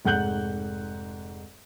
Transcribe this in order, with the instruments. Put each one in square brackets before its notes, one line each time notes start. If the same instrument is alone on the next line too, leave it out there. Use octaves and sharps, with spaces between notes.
[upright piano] F1 G#2 F#5 F#6 G6 F#7